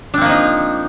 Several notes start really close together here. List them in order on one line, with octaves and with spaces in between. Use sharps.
D4 C4 A#3 F3 D#4